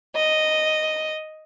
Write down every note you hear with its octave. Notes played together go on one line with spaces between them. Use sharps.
D#5